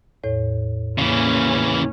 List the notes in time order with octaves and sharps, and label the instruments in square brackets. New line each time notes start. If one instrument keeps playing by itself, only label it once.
[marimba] E2 A2 C#5
[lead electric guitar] C#3 E3 [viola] A#3 C#4